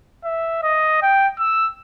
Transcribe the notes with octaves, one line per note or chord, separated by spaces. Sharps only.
E5
D#5
G5
E6